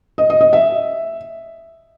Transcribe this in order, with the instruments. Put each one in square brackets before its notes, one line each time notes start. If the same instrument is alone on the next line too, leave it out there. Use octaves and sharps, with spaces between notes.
[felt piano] D#5
D#5
D#5
E5